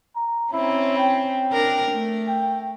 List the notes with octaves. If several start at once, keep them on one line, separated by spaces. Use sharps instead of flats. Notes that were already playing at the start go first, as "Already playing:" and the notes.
A#5
C4 C#4 E4
G5
D4 A#4
A3
G5